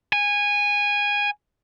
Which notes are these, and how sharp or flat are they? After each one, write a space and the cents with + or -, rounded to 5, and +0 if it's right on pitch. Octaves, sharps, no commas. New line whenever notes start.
G#5 -15